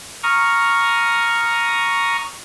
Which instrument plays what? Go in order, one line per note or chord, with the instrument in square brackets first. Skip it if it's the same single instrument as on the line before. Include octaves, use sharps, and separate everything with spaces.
[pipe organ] A#5 C#6 D#6 F6